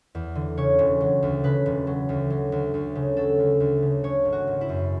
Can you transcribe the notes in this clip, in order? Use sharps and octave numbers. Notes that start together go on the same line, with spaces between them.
E2
D3
C#3 C#5
E1
F#3
D2
C#3 B4
E1
F#3
D2
F#3
D2
D2
C#3
F#3 A4
D2
D2
C#3
C#3 C#5
G#1
F#4
G#1
E4
F#2